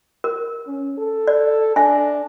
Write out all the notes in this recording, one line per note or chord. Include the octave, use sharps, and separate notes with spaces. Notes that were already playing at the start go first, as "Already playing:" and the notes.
A#4
C#4
A4
D5
D4 E5 G#5